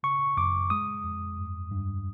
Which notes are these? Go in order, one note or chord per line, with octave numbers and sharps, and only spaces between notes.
C#3 C#6
F#2 D6
G#3 D#6
F2
G2
G2